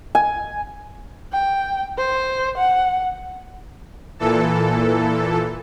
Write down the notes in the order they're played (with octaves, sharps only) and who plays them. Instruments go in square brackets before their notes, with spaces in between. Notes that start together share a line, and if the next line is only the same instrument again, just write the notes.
[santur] G#5
[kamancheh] G5
C5
F#5
[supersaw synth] A#2 E3 A4